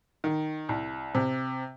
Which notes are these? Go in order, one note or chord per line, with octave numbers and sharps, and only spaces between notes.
D#3
C2
C3